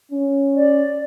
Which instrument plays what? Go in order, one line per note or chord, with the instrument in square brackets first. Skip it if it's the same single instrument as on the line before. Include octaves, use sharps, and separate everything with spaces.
[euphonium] C#4
[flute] D5